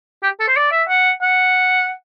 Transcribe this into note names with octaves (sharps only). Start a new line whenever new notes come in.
G4
A4
C5
D5
E5
F#5
F#5